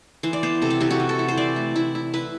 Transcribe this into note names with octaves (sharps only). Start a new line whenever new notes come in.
E3 C5
D5
B3 C5
C3 A4
G4
E3 G4
F#4
E3
A4
E4
C5
E3 D5
A3
E4
E4
E4 B4